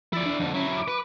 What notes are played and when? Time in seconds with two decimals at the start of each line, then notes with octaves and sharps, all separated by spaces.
0.13 F3 E4 D5 A6
0.26 D4
0.40 F2 D3
0.54 F#3 C#4 E4
0.72 D6
0.88 B4